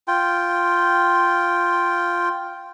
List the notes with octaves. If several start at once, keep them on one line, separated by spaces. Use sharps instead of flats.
F4 G5